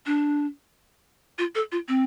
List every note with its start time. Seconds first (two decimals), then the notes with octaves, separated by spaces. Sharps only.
0.06 D4
1.38 F4
1.55 A4
1.72 F4
1.88 C4